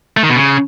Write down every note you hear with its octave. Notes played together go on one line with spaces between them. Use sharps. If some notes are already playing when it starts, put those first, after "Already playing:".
A3
D#3
B2
C#3